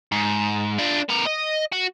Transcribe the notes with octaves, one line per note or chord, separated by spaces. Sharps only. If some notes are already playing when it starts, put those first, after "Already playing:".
G#2
D4 F4
B3 A#4
D#5
F#4